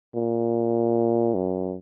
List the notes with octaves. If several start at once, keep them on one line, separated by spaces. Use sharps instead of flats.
A#2
F#2